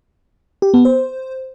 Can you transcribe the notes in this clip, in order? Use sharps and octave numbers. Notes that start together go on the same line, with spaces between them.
G4
B3
C5